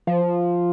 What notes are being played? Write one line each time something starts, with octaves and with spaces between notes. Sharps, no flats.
F3